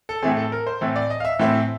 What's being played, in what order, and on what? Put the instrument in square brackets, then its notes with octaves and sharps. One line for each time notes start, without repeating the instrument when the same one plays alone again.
[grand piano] A4
A2 E3 A3 C4 G#4
A4
A#4
C5
A2 E3 A3 C4
D5
D#5
F5
E5
A2 E3 A3 C4